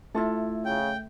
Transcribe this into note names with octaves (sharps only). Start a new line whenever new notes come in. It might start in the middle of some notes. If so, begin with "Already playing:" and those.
A3 E4 F4 A4
C#3 G5